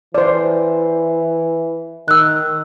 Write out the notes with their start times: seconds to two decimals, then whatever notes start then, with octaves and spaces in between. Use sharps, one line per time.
0.15 E3 C5 D5
2.08 D#3 E6 F#6